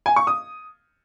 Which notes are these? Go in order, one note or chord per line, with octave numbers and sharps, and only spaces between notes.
G#5
C#6
D#6